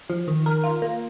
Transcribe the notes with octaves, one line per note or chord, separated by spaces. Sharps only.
F3
D#3
A#4
F4
A#3